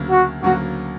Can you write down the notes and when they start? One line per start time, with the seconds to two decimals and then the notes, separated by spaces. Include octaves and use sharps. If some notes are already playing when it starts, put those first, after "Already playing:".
Already playing: D2 C#3 F#3 A#3
0.10 F#4
0.43 D2 C#3 F#3 A#3 F#4